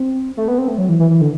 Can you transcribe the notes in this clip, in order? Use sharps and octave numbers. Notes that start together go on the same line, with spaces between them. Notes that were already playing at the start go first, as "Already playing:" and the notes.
Already playing: C4
A3
B3
C4
A3
F#3
E3
E3
E3
D3